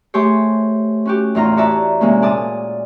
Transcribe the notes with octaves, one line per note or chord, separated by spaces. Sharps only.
A3 G4 G#4 C5 C#5
C#4 F#4 G4
E2 A2 D#4 F4 A#5
F#4 C#5 D5 E5 A5 A#5
C3 G#3 A#3 C#4
A#2 G#4 D5 A5 D#6